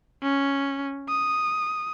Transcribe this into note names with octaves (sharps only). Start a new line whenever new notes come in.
C#4
D#6